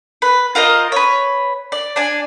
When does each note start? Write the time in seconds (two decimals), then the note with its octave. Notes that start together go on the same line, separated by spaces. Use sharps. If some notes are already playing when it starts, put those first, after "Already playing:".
0.22 B4
0.55 F4 A#4 C5 D#5
0.92 B4 C#5
1.72 D5
1.96 D4 D5 G#5